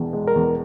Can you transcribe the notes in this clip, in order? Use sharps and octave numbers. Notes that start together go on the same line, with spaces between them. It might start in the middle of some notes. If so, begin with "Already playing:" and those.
Already playing: E1 E2
G#3
A#4
E2